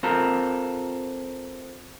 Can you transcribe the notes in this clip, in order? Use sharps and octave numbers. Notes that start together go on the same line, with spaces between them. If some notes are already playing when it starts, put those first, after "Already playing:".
C4 F4 A4 A#4